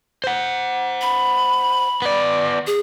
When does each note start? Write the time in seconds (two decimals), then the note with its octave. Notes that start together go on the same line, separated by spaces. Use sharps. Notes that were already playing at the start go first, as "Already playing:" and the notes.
0.24 C5 F#5
1.02 B5
2.02 B3 D5
2.67 G#4